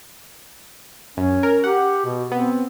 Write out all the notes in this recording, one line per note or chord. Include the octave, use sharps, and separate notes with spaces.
F#2 C#4
A#4
G4 F#5
B2
B3 C4